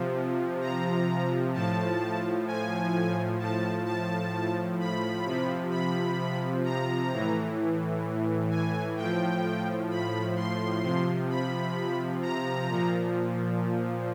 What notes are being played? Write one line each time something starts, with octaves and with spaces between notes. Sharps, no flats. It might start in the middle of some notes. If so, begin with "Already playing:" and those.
Already playing: C3 F3
A#5
A2 F3 A5
G#5
A2 F3 A5
A5
B5
C3 F3
B5
A#5
A2 E3
G#5
A2 F3 G5
B5
C6
C3 F3
B5
A#5
A#2 F3